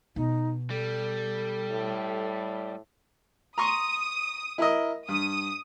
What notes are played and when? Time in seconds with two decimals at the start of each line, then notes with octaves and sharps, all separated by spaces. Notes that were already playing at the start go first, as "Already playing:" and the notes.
0.16 B2 D#4
0.70 G3 A4
1.71 A2
3.58 A#5 C6 C#6 D#6
4.58 E4 A#4 D#5
5.08 G2 D#6